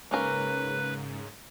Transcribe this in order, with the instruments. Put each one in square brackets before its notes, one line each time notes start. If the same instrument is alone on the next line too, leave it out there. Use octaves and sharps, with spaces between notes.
[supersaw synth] G#2 C#3 [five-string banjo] A#3 C#4 A#4 [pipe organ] B4